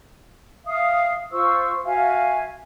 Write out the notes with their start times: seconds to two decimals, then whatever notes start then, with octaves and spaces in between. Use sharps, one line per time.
0.66 E5 F5 D#6
1.32 F4 C5 C#6 E6
1.85 F#4 E5 F5 G#5